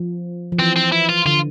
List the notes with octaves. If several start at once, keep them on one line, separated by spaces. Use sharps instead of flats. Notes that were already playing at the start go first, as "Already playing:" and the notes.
Already playing: F3
F3
E3 C4
C4
E4
F4
D3 F4